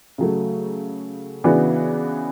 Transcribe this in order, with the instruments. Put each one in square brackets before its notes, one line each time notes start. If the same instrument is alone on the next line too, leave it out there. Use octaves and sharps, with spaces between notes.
[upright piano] C#3 F#3 A3
C#3 E3 B3 D4 F#4